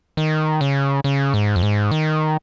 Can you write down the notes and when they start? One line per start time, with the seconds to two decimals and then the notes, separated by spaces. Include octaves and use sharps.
0.17 D#3
0.61 C#3
1.04 C#3
1.34 G#2
1.56 F2
1.63 G#2
1.91 D#3